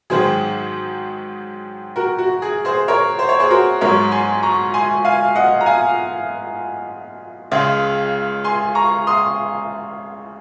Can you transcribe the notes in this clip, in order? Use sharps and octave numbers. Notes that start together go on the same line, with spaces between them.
G#2 D#3 F#3 G#4 C5
F#4 A#4
F#4
G#4
G#4 C5
A#4 C#5
C5
C#5
G#4 C5
F#4 A#4
G#2 F#3 A#4 C#5
G#5 C6
A#5 C#6
G#5 C6
F5 G#5
D#5 F#5
A#5
F5 G#5
C#2 C#3 G#3
G#5 C6
A#5 C#6
C6 D#6